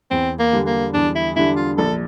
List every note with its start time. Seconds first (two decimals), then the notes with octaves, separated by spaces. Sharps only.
0.11 E2 C4
0.39 A#3
0.52 D3 G3 D4
0.67 A#3
0.94 E2 D4
1.15 E4
1.36 D3 G3 D4 E4
1.57 F4
1.78 A#1 A4